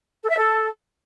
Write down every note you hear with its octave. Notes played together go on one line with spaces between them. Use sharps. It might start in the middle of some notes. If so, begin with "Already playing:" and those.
A4
E5
A4